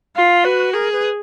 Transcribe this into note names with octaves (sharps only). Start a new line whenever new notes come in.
F4 F5
F#4 B4
G#4 A#4
B4